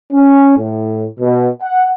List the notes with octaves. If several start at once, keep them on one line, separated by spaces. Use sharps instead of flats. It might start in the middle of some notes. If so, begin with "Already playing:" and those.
C#4
A2
B2
F#5